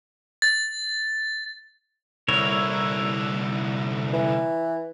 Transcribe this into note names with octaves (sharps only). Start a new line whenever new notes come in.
A6
C2 D3 E4 A#4 C#5
E3